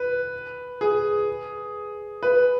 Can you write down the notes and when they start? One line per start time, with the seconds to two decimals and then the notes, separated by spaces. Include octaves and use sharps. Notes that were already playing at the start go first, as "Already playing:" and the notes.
Already playing: B4
0.81 G#4
2.23 B4